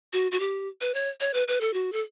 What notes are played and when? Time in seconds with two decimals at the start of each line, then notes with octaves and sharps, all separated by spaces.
0.13 F#4
0.32 F#4
0.40 G4
0.81 B4
0.94 C#5
1.20 C#5
1.34 B4
1.48 B4
1.61 A4
1.74 F#4
1.93 A4